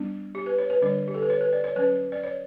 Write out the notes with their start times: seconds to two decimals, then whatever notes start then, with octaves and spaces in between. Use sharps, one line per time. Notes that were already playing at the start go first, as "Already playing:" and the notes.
Already playing: G3 B3 D4
0.35 G4
0.46 B4
0.58 C#5
0.70 B4
0.81 D3 G3 D4 C#5
1.08 G4
1.14 A4
1.22 B4
1.30 C#5
1.41 B4
1.53 D5
1.64 C#5
1.76 F#3 C#4 B4
2.12 D5
2.23 C#5